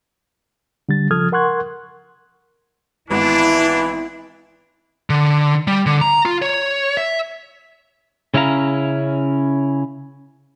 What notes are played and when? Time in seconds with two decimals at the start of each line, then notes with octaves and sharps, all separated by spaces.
0.89 D3 G3 A6
1.11 C#3 F3 A4 D#6 F6 G#6
1.32 A#4 F#5 C6 C#6 F#6 G#6
3.11 G#1 E3 B3 D4 E4 B5
5.10 D3
5.68 G3
5.86 D3
6.01 A#5
6.26 F4
6.42 C#5
6.97 E5
8.34 C#3 C#4 E4 F5 A#5